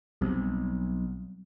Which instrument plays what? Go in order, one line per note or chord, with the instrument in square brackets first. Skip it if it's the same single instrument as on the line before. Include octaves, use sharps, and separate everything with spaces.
[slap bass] B1 [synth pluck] F#3 G3 C4